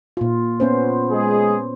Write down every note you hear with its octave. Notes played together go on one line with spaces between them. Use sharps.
A#2 F4
B3 C#4 C5
G#3 G#4